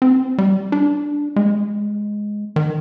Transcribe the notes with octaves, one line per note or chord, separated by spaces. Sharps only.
C4
G3
D4
G#3
D#3